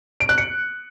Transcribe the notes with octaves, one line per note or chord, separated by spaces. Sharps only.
D7
F#6
C#7